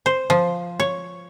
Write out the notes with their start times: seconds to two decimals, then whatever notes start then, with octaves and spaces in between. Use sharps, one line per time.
0.06 C5
0.30 F3
0.80 C#5